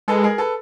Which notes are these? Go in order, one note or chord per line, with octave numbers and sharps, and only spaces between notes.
G#3 A4 B4
G#4 A#4
A4 B4